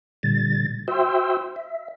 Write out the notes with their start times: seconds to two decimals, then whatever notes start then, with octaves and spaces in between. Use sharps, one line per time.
0.23 A#2 D3 G3 A6
0.88 F#4 C5 E5 G5 C6 E6
1.56 E5